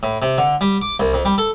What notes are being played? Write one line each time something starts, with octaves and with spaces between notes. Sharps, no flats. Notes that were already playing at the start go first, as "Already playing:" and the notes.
A2
C3
D3
G3
D6
C2
F2
G3
A4